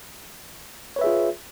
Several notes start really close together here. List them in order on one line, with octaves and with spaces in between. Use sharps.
C#5 B4 E5 G#4 F4